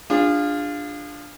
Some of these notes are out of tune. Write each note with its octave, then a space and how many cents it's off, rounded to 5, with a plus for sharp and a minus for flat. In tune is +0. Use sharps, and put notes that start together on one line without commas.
D4 +0 F4 +0 G#4 -35